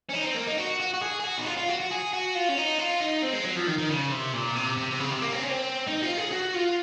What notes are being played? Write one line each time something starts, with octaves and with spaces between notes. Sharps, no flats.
C#4
D#4
C4
A#3
D#4
F#4
F#4
F#4
G#4
G#4
F#4
D#4
F4
F4
F#4
F#4
G#4
F#4
F4
C#4
D#4
F4
D#4
C4
G#3
F#3
F3
D#3
D#3
C#3
C3
A#2
C3
C3
C3
C#3
C3
A#3
C4
C#4
C4
D#4
F4
G#4
F#4
F4